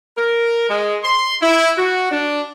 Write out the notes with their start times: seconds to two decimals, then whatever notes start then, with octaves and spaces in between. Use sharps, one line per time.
0.17 A#4
0.70 G#3
1.04 C6
1.42 E4
1.77 F#4
2.11 D4